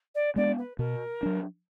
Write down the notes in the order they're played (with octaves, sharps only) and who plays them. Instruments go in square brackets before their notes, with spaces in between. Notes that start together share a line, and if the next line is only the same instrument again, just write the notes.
[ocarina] D5
[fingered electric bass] G#3 B3 D4 [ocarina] D5
[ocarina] B4
[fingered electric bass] B2 [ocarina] A#4
[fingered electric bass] F#3 D4